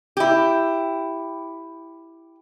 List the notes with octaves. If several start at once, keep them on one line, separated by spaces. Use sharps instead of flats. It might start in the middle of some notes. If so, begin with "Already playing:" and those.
E4 G4